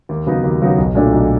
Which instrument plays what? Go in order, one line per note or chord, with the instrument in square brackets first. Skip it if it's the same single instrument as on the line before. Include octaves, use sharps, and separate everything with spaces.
[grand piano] D#2
C#3 F#3 B3 D#4
D#2
C#3 F#3 B3 D#4
B1
A#2 F#3 A3 D4
B1